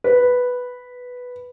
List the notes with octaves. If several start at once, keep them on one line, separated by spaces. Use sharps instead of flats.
B4